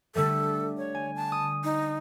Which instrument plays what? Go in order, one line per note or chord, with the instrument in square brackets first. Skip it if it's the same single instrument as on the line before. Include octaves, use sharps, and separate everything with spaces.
[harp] D3 G3 A3 [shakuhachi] A4
[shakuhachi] C#5
[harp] G#5
[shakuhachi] A5
[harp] D#6
[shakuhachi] D#4